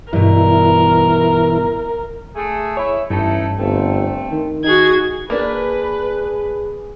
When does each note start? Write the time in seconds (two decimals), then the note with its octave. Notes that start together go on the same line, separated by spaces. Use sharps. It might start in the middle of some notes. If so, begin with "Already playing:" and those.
0.13 G2 B2 E3 E4 A#4
2.35 A3 G#4
2.77 E4 C#5 E5
3.10 A1 G2 A3 D#4 E4 A5
3.59 G1 A3 C4
4.32 D#3
4.64 D#4 F#4 G#4 G#6
5.30 A#3 D4 G#4 B4